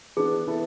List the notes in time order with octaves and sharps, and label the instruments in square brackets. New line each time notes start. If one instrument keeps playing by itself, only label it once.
[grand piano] E3 B3 D4 [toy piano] G#4
[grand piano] E3 B3 E4 A4